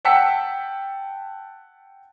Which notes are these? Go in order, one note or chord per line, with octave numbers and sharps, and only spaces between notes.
F#5 G5 A5 E6 B6 C#7